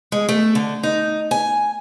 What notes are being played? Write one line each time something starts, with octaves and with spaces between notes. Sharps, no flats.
G#3
A3
D3
D#4
G#5